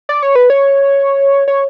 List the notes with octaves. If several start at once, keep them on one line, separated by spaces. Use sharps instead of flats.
D5
C#5
B4
C#5
C#5